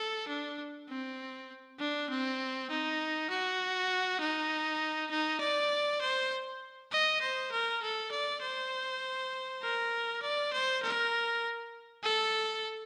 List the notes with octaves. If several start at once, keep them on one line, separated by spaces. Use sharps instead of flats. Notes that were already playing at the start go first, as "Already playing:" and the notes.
Already playing: A4
D4
C4
D4
C4
D#4
F#4
D#4
D#4
D5
C5
D#5
C5
A#4
A4
D5
C5
A#4
D5
C5
A#4
A4